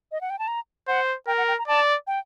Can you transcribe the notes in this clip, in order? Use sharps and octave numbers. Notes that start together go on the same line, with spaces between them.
D#5
F#5
G5
A5
A#5
C5 F#5
A#4 G5
F#5
G5
A#5
D5 A5
G5